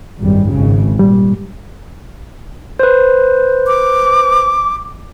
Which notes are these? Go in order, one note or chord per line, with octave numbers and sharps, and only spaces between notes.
G#1 F#2 G3
G#1 C#3
A#2 G3
B4 C5
D6